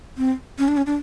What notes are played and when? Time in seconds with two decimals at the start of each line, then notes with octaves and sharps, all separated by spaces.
0.17 C4
0.59 C#4
0.68 D4
0.77 C#4
0.86 D4